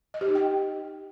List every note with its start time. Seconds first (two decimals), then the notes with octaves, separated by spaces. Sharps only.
0.14 D#5
0.21 G4
0.28 D#4
0.35 G5